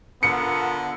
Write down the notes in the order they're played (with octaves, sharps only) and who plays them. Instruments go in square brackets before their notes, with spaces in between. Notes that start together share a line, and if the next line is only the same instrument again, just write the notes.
[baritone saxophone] D3 [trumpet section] B3 F4 A#4 [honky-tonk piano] C#7